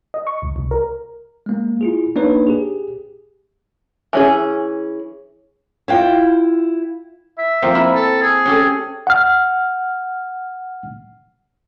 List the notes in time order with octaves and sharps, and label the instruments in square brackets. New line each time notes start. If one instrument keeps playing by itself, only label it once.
[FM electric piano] D#5
C#6
C#2
C2
A#4
[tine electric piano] G#3 A#3
E4 F4 G#4
A#3 D4 D#4 B4 C#5
G4 G#4
[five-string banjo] E3 C#4 G#4
[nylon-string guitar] E4 F4 G5
[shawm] E5
[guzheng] F3 A#3 C4
E4 A#4
[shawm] A4
G#4
[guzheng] C#4 G4 A4
[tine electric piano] F#5 F6